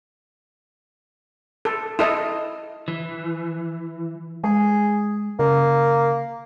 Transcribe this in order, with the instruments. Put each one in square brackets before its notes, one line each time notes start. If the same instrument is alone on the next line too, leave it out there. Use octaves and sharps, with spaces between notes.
[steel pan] A4
E4 A4 D#5
[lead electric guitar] E3
[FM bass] G#3 [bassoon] G#4
[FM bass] C#3 [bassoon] A#3